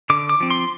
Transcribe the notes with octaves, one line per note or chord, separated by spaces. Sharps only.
D3 D6
D6
F3 C4
C6